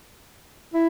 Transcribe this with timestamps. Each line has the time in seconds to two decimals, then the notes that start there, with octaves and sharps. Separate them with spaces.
0.74 E4